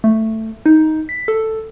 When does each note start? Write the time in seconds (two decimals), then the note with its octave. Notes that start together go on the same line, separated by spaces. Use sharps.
0.04 A3
0.66 D#4
1.09 B6
1.28 A4